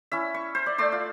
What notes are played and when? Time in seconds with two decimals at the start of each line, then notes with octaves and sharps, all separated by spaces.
0.12 C#4 E4 E5
0.34 C#6
0.55 C5
0.66 D5
0.78 A3 D5 C6 E6
0.92 F4